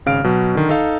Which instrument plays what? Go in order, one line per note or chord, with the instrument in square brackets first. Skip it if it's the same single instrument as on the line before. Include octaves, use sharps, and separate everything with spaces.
[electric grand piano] G#1 C#3 F5 F6 D7
B2 F#3
D3 D#3
D#4 A4 F5